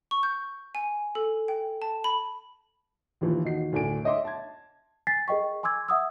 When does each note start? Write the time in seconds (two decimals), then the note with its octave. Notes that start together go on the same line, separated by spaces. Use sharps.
0.11 C#6
0.23 G6
0.75 G#5
1.15 A4
1.48 G5
1.82 A5
2.04 B5
3.21 D#2 A#2 E3 F3
3.44 D#2 D#4 F#4 C7
3.72 D2 A2 D4 A#4 G#5 D7
4.04 C#5 D#5 E5 C6 D6
4.25 A5 G#6
5.07 G#5 A6 B6 C7
5.28 G#4 A#4 D#5 G5 C#6
5.63 G#5 C6 D6 E6 G#6
5.89 E5 F#5 D#6 E6